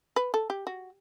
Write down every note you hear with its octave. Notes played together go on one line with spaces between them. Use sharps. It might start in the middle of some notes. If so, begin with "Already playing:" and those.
B4
A4
G4
F#4